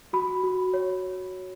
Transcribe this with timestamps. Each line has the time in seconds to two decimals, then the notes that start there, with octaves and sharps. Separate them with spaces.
0.13 F#4 B5
0.43 F#4
0.74 C#5